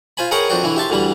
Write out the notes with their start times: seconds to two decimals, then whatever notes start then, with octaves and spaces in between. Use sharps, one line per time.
0.17 F4 C5 G#5 B5
0.31 G#4 A#4 B4 C#5 F#5 G5
0.50 F2 C4 D4 F#4 G5
0.63 D3 E3 E4
0.76 G4 E5 A5 C6
0.90 D2 D3 E3 G3 B5